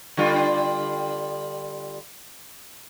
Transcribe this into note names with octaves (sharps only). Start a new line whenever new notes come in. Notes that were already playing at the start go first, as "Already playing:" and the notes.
D3 G3 F4